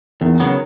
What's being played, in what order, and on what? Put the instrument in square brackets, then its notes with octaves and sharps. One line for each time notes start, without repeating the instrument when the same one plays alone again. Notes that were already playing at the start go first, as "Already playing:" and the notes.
[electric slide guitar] E2 [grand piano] D#3
[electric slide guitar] C#3 F#3 B3